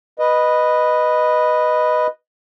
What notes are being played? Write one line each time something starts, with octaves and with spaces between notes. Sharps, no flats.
B4 D#5